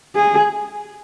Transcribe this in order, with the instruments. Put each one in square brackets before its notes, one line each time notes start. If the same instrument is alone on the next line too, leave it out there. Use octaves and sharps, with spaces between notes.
[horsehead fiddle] G#4